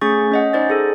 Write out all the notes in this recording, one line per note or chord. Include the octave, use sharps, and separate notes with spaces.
A3 C#4 G#4 C#6 A6
C#4 D#5 F#5
D#4 C5 D5 G6 A6
G#4 A4